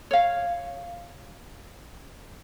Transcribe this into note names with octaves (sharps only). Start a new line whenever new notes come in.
C#5 F5